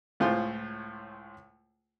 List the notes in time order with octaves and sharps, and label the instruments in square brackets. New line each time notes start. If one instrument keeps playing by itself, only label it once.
[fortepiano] C#2 A2 F4 G#4 C5 C6